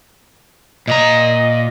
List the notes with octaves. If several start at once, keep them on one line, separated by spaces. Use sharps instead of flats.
A#2 D#5 A#5